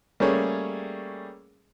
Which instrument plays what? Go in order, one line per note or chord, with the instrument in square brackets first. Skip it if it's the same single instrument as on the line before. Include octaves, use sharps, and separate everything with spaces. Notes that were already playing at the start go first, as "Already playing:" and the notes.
[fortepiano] G3 A3 A#3 C#4 G#4 C#5